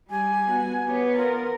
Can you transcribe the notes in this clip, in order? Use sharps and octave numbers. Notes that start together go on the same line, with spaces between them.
G3 G4 G#5
B3 F#4
B3 G4 C#5
F4 A#4